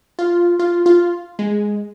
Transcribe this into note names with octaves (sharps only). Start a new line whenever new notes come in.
F4
F4
F4
G#3